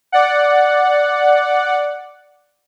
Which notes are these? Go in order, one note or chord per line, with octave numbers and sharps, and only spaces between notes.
D5 F#5